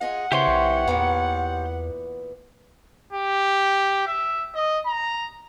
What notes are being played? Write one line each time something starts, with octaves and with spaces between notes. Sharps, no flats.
F4 G#4 D#5 F#5
C#3 E3 C4 E4 G4 C#5 C6
B1
E2 A#2 E3 B3
G4
E5
D#5
A#5